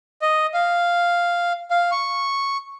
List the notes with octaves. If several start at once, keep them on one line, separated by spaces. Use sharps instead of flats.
D#5
F5
F5
C#6